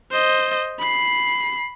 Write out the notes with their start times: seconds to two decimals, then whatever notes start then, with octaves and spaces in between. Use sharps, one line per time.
0.11 C5 D#5
0.79 B5 C7